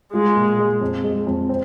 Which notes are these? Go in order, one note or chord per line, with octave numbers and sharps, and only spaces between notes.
G#3 F4
A#2
G#3
F2
G#3
F2
C4